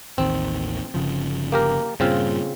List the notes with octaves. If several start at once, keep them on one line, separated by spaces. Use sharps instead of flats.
A1 D#2 D#3 C4
G1 C#3 F3
A#3 G4 A#4
G2 A#2 C#3 C4 F4